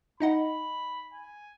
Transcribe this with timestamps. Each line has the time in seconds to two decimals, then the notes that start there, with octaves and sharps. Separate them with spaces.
0.20 D#4 D#5 F#5 B5
1.13 G#5